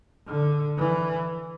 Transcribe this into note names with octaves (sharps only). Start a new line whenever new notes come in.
D3
E3